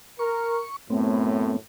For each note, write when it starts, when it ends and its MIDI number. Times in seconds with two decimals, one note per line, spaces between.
0.19 0.62 70
0.19 0.76 85
0.90 1.57 42
0.90 1.57 45
0.90 1.56 57
0.90 1.56 59
0.90 1.56 60